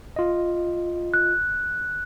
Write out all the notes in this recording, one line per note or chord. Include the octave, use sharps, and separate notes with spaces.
F4 D#5
F#6